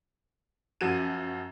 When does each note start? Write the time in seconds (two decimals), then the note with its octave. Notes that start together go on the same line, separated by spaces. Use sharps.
0.81 F#2 F3 F#4 G#6 D#7